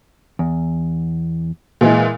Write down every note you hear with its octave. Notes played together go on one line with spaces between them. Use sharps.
E2
A#2 E3 G#3